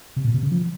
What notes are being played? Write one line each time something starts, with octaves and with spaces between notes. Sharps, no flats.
C3
A#2
C3
C#3
F3